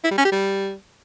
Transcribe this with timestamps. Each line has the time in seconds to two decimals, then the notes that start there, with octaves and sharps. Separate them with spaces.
0.04 E4
0.11 G3
0.18 C#4
0.25 G4
0.32 G3